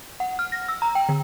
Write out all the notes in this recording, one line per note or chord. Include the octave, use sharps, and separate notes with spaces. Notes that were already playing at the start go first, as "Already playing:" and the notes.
F#5
F6
A#6
E6
A#5
G5
D3